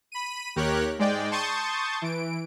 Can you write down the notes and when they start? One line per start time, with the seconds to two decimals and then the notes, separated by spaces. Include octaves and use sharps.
0.12 B5 D#7
0.56 D#2 G4 A#4 C#5 F#6
0.98 G#2 G#3 D5 G5
1.31 A5 C6 C#6 D#6 G6 A6
2.02 E3 D7